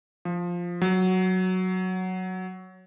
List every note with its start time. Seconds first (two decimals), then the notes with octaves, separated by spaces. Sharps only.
0.25 F3
0.82 F#3